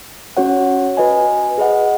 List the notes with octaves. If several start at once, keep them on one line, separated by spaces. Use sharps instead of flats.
C#4 F#4 C#5 F#5
F#4 B4 D#5 G#5
G#4 B4 D#5 F#5